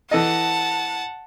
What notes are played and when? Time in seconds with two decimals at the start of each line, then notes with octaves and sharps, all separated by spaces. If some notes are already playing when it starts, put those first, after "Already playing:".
0.11 E3 A4 D#5 F#5 A5